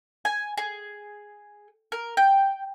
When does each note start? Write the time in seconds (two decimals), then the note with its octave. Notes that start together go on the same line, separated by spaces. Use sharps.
0.25 G#5
0.57 G#4
1.92 A#4
2.17 G5